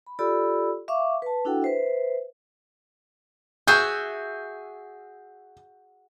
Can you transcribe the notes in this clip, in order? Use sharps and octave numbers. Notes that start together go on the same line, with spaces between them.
B5
F4 G4 A4 D5 B5 E6
E5 F5 C#6 D6
B4 A5
D4 E4 F#4 A4 F#5 G5
B4 C5 E5
F#4 G#4 E5 G6